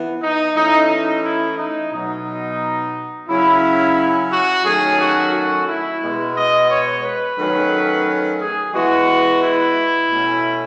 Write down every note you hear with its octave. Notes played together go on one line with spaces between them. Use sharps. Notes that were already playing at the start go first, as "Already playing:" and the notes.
Already playing: E3 B3
D#4
E3 A3 C#4 D#4
D#4
E4
D#4
B2 F#3 B3 D#4
C#3 F#3 C#4 E4
F#4
D#3 F#3 A3 C#4 G#4
F#4
F#4
E4
B2 G#3 B3
D#5
C#5
B4
D#3 F#3 A3 C#4
G#4
E3 G#3 B3 F#4
E4
B2 A3 C#4